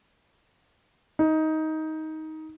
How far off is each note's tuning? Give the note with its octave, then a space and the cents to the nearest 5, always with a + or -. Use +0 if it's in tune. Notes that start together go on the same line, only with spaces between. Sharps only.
D#4 +15